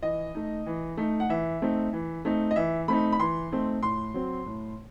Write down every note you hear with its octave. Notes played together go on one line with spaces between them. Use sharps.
E3 D#5
A3 D#4
E3
A3 D#4
F#5
E3 E5
A3 C4 D#4
E3
A3 C4 D#4
D#5
E3 E5
A3 C4 D#4 B5
B5
E3 C6
A3 C4 D#4
A2 C6
F#3 C4
A2